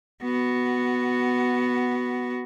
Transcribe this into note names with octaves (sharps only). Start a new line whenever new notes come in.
B3 F#4